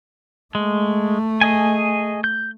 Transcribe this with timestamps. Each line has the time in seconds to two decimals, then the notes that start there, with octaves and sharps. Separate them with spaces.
0.55 G#3 A3
1.41 G#4 D#5 G#5
2.24 G6